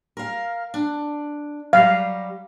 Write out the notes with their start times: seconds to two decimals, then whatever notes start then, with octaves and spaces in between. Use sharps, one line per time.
0.17 A#4 F5
0.74 D4
1.73 F#3 G3 F5